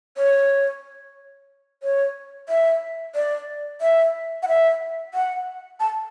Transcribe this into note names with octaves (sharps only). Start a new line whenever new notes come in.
C#5
C#5
E5
D5
E5
F#5
E5
F#5
A5